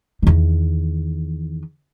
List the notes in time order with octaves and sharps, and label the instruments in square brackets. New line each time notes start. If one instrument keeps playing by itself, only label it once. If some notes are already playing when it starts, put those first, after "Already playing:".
[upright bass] E2 D#3